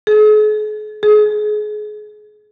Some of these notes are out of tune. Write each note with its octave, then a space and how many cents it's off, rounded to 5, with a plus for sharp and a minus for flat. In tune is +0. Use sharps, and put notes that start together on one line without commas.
G#4 +45
G#4 +30